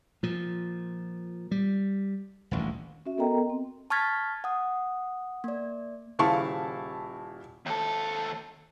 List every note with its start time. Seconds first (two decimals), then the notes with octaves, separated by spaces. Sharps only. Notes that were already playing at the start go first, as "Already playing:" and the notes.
0.23 A#2 F3
1.51 G3
2.51 D#1 A1 D2
3.06 C#4 F#4 E5
3.18 B3 A4 A#4 D#5 G5 A#5
3.50 C4
3.90 A5 C#6 F6 G#6 A6 B6
4.44 F#5 D#6
5.44 A#3 D5
6.19 D#1 C#3 E4 F5 A5 C#6
7.66 D#2 A4